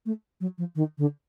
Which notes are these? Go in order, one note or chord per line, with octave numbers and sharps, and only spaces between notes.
A3
F#3
F3
D#3
D3